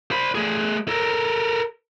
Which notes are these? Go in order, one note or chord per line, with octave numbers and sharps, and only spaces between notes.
C5 B5
A3 G#4
A4 A#4